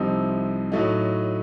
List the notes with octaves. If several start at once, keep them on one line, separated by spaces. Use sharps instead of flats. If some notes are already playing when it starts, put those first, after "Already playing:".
Already playing: C2 C3 F3 C4 D#4
A2 F#3 A3 D#4